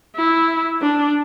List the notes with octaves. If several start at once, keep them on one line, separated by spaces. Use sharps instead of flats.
E4
D4